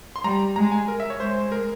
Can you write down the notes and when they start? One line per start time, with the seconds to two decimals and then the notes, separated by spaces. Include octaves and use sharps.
0.16 C6
0.24 G3 A#5
0.56 G#3 A#5
0.72 G#5
0.88 A#4
1.00 E5
1.10 C#5
1.20 G#3 C5
1.52 A#4